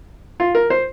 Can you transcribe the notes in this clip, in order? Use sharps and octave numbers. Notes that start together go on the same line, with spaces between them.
F4
A#4
C5